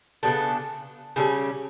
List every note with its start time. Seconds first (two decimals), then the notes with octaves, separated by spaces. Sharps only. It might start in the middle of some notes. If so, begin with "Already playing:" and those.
0.23 C#3 G3 B3 D4 A4
1.16 C#3 G3 C#4 A4